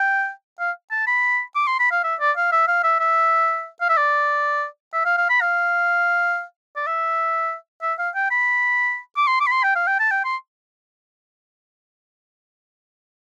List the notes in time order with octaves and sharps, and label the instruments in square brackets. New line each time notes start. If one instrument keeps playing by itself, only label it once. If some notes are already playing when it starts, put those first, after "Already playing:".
Already playing: [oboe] G5
F5
A5
B5
D6
C6
B5
F5
E5
D5
F5
E5
F5
E5
E5
F5
E5
D5
E5
F5
F5
B5
F5
D5
E5
E5
F5
G5
B5
D6
C6
D6
B5
C6
G5
F5
G5
A5
G5
C6